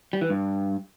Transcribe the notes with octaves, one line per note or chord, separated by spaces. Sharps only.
G3
E3
G2